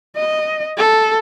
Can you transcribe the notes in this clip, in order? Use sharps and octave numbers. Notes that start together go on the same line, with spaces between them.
D#5
A4